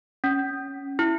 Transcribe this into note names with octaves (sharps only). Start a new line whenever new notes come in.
C#4
E4